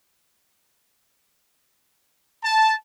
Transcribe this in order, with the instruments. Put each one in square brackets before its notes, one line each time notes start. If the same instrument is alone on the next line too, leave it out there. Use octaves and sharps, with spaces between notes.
[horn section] A5